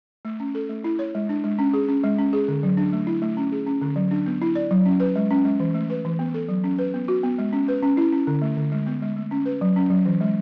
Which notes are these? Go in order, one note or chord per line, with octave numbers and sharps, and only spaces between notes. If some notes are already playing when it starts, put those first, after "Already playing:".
A3
C#4
A4
A3
E4
C#5
G#3
D4
G#3
C#4
G#4
C#4
G#3
C#4
G#4
D3
F#3
D4
A3
E4
A3
C#4
G#4
C#4
D3
F#3
D4
B3
E4
D5
F#3
C#4
B4
G#3
C#4
G#3
E3
A3
B4
E3
B3
A4
F#3
C#4
B4
B3
F#4
B3
G#3
C#4
B4
C#4
E4
C#4
D3
A3
D3
G#3
B3
G#3
A3
C#4
B4
F#3
C#4
F#3
E3
G#3